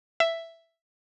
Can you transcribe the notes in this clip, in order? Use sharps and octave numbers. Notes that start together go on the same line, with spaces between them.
E5